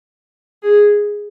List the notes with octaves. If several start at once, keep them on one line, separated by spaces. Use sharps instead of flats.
G#4